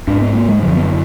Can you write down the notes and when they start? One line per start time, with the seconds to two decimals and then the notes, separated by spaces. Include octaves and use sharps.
0.07 G#2 D4
0.21 B3
0.35 A#3
0.48 G#3
0.63 F#2 D3 F3
0.76 B3